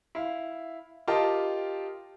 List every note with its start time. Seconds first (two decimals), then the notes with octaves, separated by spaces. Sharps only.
0.15 E4 F5
1.08 F4 G4 A#4 D#5 G5 A5